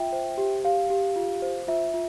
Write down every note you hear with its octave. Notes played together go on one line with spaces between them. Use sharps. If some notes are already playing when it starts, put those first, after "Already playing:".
Already playing: F4 E5 G5
C5
G4
G4 F5
G4
F4
C5
F4 E5
F4